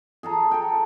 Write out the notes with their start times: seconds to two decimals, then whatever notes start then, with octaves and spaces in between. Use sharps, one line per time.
0.23 G#4 A4 A#5
0.51 A4 G5